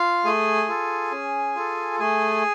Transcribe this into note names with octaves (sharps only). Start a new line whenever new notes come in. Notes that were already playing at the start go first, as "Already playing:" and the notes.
Already playing: F4 F5
A3 G#4 G#5
F4 A4
C#4
F4 A4
A3 G#4 G#5